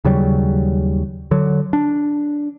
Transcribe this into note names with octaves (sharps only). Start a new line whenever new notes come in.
D#2 C#3 F#3 G3
D3 F#3
D4